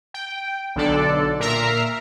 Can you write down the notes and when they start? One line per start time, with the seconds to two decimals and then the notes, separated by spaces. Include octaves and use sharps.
0.14 G5
0.76 B1 D3 D4 A4 D5
1.40 A#2 A#4 E5 A#5 C7